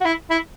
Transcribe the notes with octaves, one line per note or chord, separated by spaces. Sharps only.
F#4
E4
E4